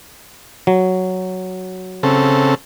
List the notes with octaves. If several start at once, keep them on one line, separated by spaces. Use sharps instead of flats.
F#3
C#3 C4 A4